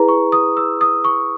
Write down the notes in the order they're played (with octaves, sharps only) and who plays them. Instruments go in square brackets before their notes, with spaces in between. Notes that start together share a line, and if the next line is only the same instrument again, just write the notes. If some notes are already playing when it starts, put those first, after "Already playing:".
Already playing: [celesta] E4 G#4 B4 A#5
C#6
D#6
E6
D#6
C#6